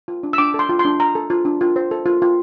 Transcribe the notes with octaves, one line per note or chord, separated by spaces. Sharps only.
F4
D4
E6
D4 D6
A4
C6
F4
C6
D4
D4 A#5
A4
F4
D4
F4
C5
A4
F4
F4